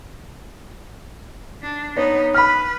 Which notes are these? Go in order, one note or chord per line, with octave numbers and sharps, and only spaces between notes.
D4
B3 D#4 C#5
B4 B5 F6